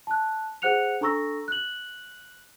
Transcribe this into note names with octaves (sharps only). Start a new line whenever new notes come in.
A5 F#6
G#4 C5 F#5 F#6 C#7 F7
D4 A4 A#5 C#6 E6 A#6
F#6 F#7